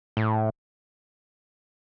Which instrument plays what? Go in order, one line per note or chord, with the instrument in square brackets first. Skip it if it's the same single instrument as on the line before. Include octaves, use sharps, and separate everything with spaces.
[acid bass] A2